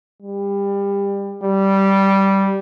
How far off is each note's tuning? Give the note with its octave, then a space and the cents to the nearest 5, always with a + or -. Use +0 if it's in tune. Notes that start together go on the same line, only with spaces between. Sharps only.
G3 +25
G3 -10